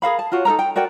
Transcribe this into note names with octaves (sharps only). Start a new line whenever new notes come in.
G#4 A#4 F5 B5
A5
F4 F#4 C#5
D#4 A4 A#4 A#5
G5
F#4 A#4 D5 G5